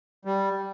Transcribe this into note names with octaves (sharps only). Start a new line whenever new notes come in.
G3